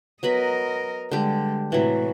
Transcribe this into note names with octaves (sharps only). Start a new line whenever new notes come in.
F#3 B3 A#4 D#5 B5
D3 G3 G#3 G4
A2 C3 E3 F#3